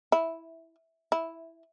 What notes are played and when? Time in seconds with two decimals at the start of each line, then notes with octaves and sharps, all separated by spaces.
0.12 E4
1.12 E4